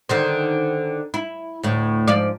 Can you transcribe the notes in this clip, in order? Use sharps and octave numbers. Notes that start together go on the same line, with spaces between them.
D3 D#3 C5
E4
D2 A2
G#2 F3 D5